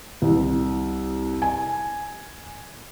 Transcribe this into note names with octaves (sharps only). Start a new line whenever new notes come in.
C2
G#5